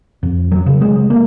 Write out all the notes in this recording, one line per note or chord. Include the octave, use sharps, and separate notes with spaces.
F2
F#3
C#3
G#3
A#3